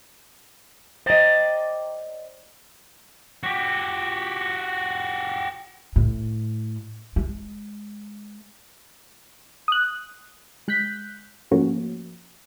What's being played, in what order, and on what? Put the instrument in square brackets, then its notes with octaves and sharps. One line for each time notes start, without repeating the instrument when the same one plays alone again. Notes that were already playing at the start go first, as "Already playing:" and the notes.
[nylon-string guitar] C5 D#5 [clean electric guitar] D5 G5 A#5
[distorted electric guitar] F#4 G4
[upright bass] A2
G#3
[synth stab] D#6 F#6
G#3 F#6 G6 B6
G#2 F3 A3 A#3 C#4 F#4